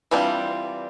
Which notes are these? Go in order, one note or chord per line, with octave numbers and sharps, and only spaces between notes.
E3 G3 C4 D4 F4